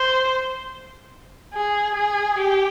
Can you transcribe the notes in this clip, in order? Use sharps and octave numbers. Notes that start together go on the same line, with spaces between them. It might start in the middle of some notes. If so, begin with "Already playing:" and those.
Already playing: C5
G#4
G#4
G4